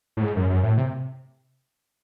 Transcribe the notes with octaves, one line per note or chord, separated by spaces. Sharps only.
A2
G#2
F#2
F#2
A2
C3